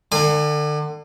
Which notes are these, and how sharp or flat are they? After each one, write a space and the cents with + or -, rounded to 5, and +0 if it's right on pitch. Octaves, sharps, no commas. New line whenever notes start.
D3 +30 G#5 -30